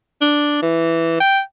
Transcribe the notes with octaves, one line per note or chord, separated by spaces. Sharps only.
D4
E3
G5